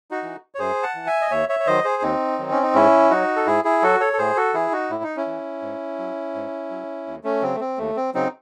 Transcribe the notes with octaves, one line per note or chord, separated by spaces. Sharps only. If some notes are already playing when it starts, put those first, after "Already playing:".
D#4 F#4
E3
C#5
F#2 G#4 C5
F#5 A5
E3
E5 G#5
D#5
D#2 C#5 E5
C#5 E5
C#5
D#3 F#3 C5 D#5
G#4 C5
D#2 C4 D#4
D#3 F#3
C#4
D#4
G#2 C#4 E4
F#3 D#4 F#4
A4
G#2 E4 G#4
E4 G#4
F#3 F#4 A4
A4 C#5
A4
A2 G#4 C5
F#4 A4
E3 E4 G#4
D#4 F#4
A2 E4
D#4
C#4 E4
E3
G#2
F#3
G#2
F#3
D#2
A3 C#4
C#3 F#3 C4
A3
C4
D#2 A3
C4
C#3 F#3 C4 D#4